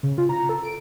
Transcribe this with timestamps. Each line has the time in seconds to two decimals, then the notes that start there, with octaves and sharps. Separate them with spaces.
0.03 C#3
0.18 F4
0.29 A#5
0.49 A4
0.63 D7